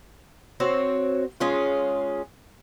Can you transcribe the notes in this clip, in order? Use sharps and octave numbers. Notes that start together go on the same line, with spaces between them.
C4 F#4 C#5
G#3 C#4 F4